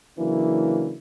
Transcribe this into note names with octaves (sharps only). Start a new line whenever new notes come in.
C#3 E3 F#3 A#3 D4 E4